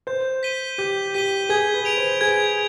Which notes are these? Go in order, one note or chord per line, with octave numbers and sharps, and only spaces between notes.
C5 G6
B6 D#7 G7
G4 G6
G4 B6 D#7 G7
G#4 G#6
B4
D7 F7
C5
G#4 G#6